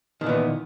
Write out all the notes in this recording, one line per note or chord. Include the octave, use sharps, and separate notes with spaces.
A#2 D#3 E3 B3